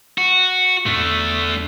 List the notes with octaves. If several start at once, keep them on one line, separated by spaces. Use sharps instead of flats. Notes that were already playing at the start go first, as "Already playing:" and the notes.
F#4
E2 A3 D4